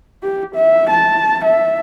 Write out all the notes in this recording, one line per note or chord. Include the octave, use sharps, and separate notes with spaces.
G4
E5
A5
E5